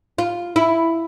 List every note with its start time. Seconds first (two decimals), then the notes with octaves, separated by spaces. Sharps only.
0.18 F4
0.56 E4